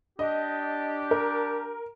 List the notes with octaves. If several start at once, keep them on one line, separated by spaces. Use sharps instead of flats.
D4 G4 D#5
A#4